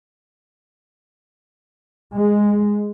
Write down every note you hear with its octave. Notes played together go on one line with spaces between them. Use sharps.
G#3